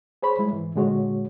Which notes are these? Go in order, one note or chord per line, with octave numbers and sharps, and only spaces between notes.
G#4 C5 C#5 B5
G3 G#3 E4
G#2 E3
A#2 D3 G#3 F#4 C#5